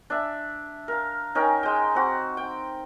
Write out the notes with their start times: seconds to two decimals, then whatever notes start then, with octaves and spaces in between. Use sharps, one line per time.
0.10 D4 E5
0.88 A#4 F5
1.35 C#4 D#4 A#4 G5
1.63 G#3 G5
1.95 C4 F#4
2.37 G5